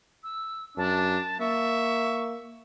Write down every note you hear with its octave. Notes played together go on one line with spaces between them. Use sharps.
E6
F#2 D4 A5
A#3 E5 C#6